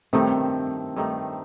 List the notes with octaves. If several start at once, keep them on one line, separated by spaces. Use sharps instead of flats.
G2 D#3 A3 C4 D#4
G2 D#3 A3 D#4